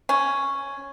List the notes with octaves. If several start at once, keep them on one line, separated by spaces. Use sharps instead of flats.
C#4